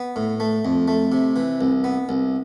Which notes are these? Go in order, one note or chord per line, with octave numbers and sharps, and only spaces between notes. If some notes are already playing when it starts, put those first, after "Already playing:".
Already playing: B3
A2
A3
F2
A3
C3
E3
C2
B3
C2